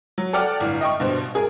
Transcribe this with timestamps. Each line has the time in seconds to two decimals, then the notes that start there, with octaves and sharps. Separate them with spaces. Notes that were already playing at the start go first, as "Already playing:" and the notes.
0.18 F#3
0.33 A4 D5 F#5 G5 D6 F6
0.60 G1 A2
0.81 D#5 G5 C#6
1.00 G2 B2 C5
1.35 G#4 A#4